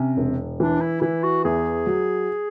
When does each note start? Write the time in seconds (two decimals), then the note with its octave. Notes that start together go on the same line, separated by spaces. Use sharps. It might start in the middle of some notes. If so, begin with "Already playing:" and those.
Already playing: C3 C#4
0.17 E1
0.60 E3 D4
0.81 E4
1.01 E3 E4
1.24 F#4
1.44 E2 G#4
1.87 F#3